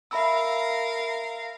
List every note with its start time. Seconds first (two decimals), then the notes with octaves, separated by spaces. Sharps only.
0.11 A#4 E5 F5 B5 E6